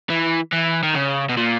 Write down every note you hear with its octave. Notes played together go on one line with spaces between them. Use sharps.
E3
E3
D#3
C#3
B2
A#2